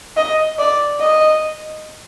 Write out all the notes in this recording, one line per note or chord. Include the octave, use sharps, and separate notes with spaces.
D#5
D5
D#5